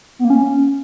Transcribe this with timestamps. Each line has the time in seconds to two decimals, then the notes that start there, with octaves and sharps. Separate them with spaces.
0.19 B3
0.25 A#3
0.30 C#4